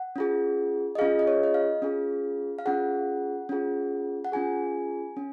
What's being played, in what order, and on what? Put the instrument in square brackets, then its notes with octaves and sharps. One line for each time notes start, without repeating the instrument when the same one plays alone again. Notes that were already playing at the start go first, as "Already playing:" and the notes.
Already playing: [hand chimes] F#5
C#4 F4 G#4
D#5
C#4 F4 G#4 F5
D#5
C#5
D#5
F5
C#4 F4 G#4
F5
C#4 F4 G#4 F#5
C#4 F4 G#4
F#5
C#4 F4 G#4 G#5
C#4